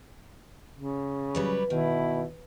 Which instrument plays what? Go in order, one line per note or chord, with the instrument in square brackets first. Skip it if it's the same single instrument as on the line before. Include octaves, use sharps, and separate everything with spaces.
[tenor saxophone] C#3
[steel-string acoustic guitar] F#3 G3 B4
[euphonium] B2 [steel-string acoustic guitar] D#3 [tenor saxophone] E4